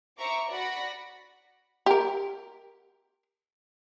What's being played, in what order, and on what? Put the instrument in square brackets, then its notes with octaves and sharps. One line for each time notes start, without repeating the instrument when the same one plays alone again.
[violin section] C5 E5 A#5 C#6 D6
F#4 D5 F#5 B5 A#6 C#7
[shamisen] G4 A#4